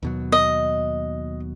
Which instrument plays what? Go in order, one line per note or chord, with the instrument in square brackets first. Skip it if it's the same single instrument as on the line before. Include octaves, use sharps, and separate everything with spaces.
[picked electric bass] D#2 B2 F#3
[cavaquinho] D#5